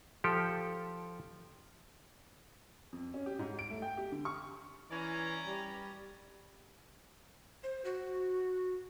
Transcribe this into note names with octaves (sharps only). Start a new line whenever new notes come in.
F3 G4 A4
F2
C#4
G4
G#2
D7
A3
G5
G4
D3
C#6
E3 C#4 D5 A#5
G3
C5
F#4